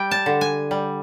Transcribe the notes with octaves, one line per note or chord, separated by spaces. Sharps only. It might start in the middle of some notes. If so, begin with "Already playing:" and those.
Already playing: G3 G5
A5
D3
G#5
G3